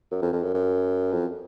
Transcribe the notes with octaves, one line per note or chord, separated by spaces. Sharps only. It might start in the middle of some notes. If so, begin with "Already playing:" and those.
F#2
F2
F2
F#2
F#2
F2